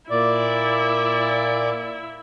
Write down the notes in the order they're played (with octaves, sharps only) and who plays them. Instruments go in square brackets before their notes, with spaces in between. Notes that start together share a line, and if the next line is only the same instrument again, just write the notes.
[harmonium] A#2 D5 [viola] E4